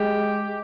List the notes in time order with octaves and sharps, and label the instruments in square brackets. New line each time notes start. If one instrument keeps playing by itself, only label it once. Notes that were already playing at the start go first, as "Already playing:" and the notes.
Already playing: [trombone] G#3 [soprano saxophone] G4